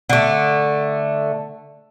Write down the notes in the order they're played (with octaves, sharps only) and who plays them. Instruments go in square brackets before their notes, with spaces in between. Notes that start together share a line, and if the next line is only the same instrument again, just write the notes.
[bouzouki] D3 A3